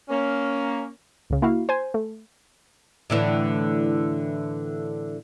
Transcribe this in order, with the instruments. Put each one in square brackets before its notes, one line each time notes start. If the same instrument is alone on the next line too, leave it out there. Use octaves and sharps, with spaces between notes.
[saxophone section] A#3 C#4
[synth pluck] C#2 C#3
A#3 E4 F#4 F5
C5 G#5
A3
[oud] A2 D3 E3